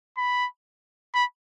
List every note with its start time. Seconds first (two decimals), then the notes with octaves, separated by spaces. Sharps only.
0.18 B5
1.15 B5